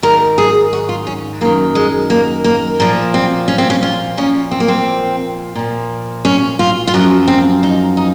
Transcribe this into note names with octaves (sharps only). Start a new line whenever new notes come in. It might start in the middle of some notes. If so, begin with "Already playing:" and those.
G#2 D#3 A#4
G#4
F#4
F4
C#4
F#2 D#3 A#3
G#3
A#3
A#3
A#2 F3 A#3
C4
C#4
C4
C#4
F4
A#2 F3 C#4
C4
A#3
C4
A#2 F3
C#4
F4
F4
F#2 F3 F#4
C4
D#4
D#4